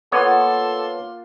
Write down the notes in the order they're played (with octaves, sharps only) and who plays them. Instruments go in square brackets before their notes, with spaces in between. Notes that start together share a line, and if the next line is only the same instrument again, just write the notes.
[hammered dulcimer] A#3 F4 F#5 [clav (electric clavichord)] B3 C#5 [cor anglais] A4 [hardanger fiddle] C6